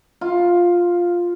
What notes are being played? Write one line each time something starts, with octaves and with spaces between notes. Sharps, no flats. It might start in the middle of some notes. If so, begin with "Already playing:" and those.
F4